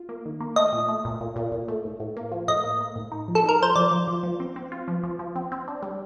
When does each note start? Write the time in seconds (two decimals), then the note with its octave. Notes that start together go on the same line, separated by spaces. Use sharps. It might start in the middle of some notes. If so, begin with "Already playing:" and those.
Already playing: F4
0.09 A#3
0.25 D#3
0.40 A#3
0.56 A3 D#5
0.73 A#2
0.88 A3
1.05 A#2
1.21 A#2
1.36 A#2
1.52 A#2
1.68 A3
1.85 A2
2.00 A2
2.17 A#3
2.32 F3
2.48 A2 D#5
2.64 A#3
2.81 A#3
2.96 A2
3.12 D#4
3.28 F3
3.35 A4
3.44 D#4 A#4
3.60 F3 C5
3.76 F3 D5
3.91 F3
4.08 F3
4.23 F3
4.40 C4
4.56 C4
4.72 F4
4.88 F3
5.03 F3
5.19 F3
5.36 C4
5.52 C4
5.68 D4
5.83 G3